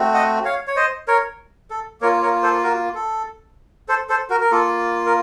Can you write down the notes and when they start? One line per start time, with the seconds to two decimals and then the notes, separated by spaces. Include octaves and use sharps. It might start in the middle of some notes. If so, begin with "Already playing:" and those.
Already playing: A3 C4 F#4
0.14 D#5 F#5
0.45 C#5 F5
0.67 C#5
0.76 C5 D#5
1.08 A#4 C#5
1.70 A4
2.01 A#3 F4 A#4 C#5
2.22 A#4 C#5
2.43 A4 C5
2.63 F#4 A#4
2.95 A4
3.88 A4 C5
4.09 A4 C5
4.30 F#4 A#4
4.41 A#4
4.51 A#3 F4 A4
5.06 A#4